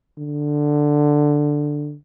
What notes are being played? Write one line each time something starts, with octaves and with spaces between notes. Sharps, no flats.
D3